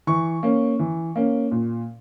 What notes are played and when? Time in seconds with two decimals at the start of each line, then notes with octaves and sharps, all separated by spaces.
0.07 E3 C#6
0.43 A#3 C#4
0.79 E3
1.16 A#3 C#4
1.51 A#2